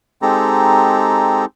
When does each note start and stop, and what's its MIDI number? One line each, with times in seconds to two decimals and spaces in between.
0.22 1.45 56
0.22 1.45 60
0.22 1.45 63
0.22 1.45 67
0.22 1.45 69
0.22 1.45 82